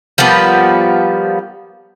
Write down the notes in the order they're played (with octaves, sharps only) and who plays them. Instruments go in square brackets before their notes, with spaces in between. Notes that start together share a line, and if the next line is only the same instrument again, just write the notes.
[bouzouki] F3 G3 A#3 B3